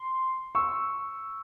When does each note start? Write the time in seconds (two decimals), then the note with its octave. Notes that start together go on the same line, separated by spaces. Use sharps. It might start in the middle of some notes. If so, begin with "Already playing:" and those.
Already playing: C6
0.55 C#6 E6